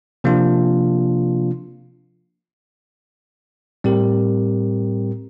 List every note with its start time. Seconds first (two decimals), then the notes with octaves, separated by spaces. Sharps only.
0.24 C3 F3 A#3 D4 F4
3.84 A2 G3 C4 G4 A#4